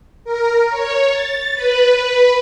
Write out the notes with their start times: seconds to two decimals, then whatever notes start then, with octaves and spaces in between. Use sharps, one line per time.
0.24 A#4
0.70 C#5
1.11 A6
1.54 B4